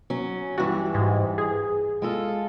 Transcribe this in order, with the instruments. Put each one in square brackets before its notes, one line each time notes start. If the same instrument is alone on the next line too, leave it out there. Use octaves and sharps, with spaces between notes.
[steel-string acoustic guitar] F#3 C#4
[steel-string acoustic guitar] G2 E3 [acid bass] F#4
[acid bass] G#2
G#4
[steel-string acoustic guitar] G#3 F4 A4